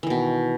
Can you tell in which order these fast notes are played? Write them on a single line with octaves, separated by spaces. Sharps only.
E3 D#3 B2